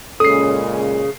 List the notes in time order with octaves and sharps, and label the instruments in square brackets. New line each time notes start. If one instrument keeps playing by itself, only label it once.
[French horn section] A#2 G#3 C#4 [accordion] C#3 [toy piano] A4 [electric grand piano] D#6 C7